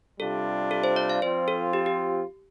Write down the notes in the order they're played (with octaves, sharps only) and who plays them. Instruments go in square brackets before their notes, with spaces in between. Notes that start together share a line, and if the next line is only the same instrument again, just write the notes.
[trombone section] C3 G3 D4 F4 [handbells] A4
[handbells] A4
C5
D5
F5
[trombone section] F3 C4 F4 [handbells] C5
[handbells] A4
G4
G4